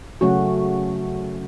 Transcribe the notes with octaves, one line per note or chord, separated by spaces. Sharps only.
C#3 F#3 A3 C#4 F#4